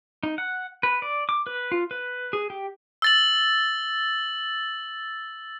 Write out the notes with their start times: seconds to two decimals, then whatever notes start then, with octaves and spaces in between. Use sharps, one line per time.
0.23 D#4
0.38 F#5
0.83 B4
1.02 D5
1.29 D6
1.47 B4
1.72 F4
1.91 B4
2.33 G#4
2.50 G4
3.02 E6 A6 F#7